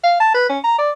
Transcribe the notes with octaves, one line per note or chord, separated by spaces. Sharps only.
F5
A5
B4
C#4
A#5
D5